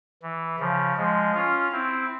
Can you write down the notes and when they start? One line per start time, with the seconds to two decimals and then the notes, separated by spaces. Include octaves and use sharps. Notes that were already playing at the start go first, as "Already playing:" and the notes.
0.22 E3
0.60 C#3 F3
0.98 F3 G#3
1.35 C#4 F4
1.72 C4 E4